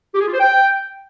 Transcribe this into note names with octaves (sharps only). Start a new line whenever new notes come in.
G4
G#4
F4
C5
G5